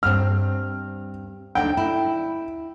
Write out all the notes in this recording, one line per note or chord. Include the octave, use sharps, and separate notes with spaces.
G2 C4 F6
D2 D4 D#4 G5
E4